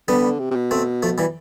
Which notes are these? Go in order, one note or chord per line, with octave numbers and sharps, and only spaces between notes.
D3 G3 B3
C3
C3
B2
A3 C4
F3 A3
E3 G3